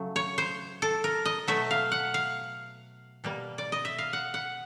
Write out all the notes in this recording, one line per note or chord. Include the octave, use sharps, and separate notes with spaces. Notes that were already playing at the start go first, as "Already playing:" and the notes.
Already playing: C#3 F#3 A3
C#5
C5
A4
A#4
D#5
B2 F#3 A3 E5
F5
F#5
F5
B2 G3 A#3
D5
D#5
E5
F5
F#5
F#5